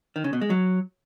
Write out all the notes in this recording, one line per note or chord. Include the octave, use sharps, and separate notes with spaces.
D#3
C#3
B2
G#3
F#3